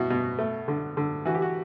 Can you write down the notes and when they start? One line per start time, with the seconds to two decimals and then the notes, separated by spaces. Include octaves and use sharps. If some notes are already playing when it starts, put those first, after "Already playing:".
Already playing: B2 E4 F#4
0.10 B2
0.39 A3
0.68 D3
0.97 D3
1.25 E3 F#4
1.35 G4
1.42 F#4